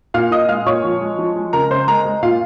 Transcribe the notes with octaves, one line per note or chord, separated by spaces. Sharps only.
A#2 F5 F6
A#2 D#5 D#6
G#3 F5 F6
A#2 C#5 C#6
F3
G#3
F3
G#3
C#3 A#4 A#5
C#3 C5 C6
G#3 A#4 A#5
G#3
A#2 F4 F5